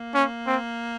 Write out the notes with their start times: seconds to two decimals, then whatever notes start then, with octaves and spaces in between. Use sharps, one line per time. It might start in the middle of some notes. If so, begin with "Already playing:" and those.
Already playing: A#3
0.15 C#4
0.47 C4